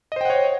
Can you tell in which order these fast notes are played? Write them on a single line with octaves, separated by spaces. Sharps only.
D#5 C5 G5 F#5 C#5